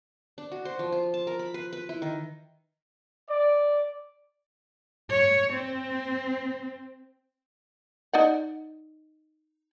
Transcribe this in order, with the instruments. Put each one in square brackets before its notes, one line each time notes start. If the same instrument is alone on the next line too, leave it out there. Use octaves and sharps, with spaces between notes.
[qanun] D4
F#4
C5
F3
F4
A5
A#4
B5
B4
B4
E4
D#3
[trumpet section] D5
[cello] C#5
C4
[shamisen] D#4 D5 F#5